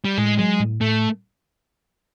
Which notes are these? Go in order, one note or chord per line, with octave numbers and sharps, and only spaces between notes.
G3
A2 G#3
F#3 G#3
A2
A2 A3